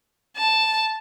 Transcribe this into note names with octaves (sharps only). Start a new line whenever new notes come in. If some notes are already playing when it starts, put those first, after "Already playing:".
A5